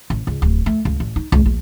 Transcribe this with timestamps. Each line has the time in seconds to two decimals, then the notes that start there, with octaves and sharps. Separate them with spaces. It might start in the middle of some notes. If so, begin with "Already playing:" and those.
0.10 A1
0.27 C#2
0.42 D1
0.66 A3
0.85 C#2
1.00 A1
1.16 D#4
1.32 C#2
1.46 A#1